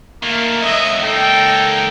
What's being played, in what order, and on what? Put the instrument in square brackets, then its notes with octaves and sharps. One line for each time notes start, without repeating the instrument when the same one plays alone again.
[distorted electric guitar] D#3 A3 [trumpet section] A#3
[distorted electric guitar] C#2 F#3 [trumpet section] D#5 E5
[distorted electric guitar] C#2 A#3 [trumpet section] D#4 A4 G5